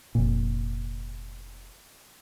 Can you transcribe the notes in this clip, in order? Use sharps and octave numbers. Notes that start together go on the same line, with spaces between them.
F1 A#2